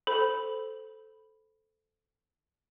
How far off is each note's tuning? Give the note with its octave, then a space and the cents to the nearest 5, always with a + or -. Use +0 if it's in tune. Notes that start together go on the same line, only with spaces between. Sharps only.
A4 -5 C5 -15 B5 +0